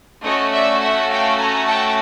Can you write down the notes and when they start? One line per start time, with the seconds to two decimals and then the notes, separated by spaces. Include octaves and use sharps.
0.23 A3 C#4 F#4 C#5 D#5
0.52 D5 E5
0.80 E5 F#5
1.09 F5 G5
1.38 G#5 A#5
1.65 G5 A5